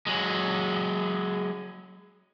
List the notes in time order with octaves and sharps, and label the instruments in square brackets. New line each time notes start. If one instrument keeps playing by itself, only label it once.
[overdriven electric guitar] F#3 G#3